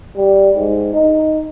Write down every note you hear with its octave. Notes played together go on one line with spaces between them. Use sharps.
G3
G#2
D#4